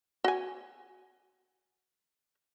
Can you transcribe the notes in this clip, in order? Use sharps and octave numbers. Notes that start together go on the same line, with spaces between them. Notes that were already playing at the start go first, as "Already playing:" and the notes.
F#4 G#5